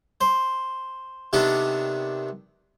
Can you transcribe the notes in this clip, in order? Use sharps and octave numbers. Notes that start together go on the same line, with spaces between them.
C5
C3 D#3 B3 D4 A4